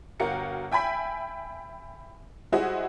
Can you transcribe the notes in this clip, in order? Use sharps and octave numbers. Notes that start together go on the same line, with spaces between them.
G1 F#4 A#4 F5 G5 C#7
E5 G5 G#5 B5 B6
G3 E4 F#4 G#4 C5 D#5